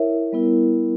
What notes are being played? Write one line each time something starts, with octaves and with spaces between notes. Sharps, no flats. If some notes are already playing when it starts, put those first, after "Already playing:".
Already playing: E4 A#4 C#5 E5
G3 B3 E4 A#4